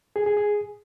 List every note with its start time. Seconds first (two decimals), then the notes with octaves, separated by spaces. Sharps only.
0.16 G#4
0.26 G#4
0.37 G#4